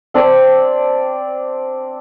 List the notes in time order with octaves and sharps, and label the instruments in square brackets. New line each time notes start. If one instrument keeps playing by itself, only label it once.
[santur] C4 D4 D5